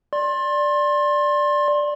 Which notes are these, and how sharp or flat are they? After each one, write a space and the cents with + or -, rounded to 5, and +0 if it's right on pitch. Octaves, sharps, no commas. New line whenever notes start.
D5 +0 C6 +30